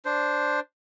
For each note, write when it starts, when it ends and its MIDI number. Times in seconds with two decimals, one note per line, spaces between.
0.05 0.60 62
0.05 0.60 72